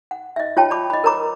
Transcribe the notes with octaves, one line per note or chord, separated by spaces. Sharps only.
F#5
D#5 E5
F4 C#5 G5 A5
D5 B5 D6
D#5 B5
A#4 B4 C#5 A#5 B5 D6